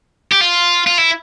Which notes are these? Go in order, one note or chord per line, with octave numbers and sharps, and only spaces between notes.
G4
F4
F4
E4